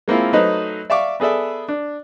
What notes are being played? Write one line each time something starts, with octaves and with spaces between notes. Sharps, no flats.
G#3 A#3 C4 E4 F4
F#3 A3 D#4 B4 C5 D#5
D5 E5 F5 C#6 D6
B3 G#4 A4 D5 E5
D4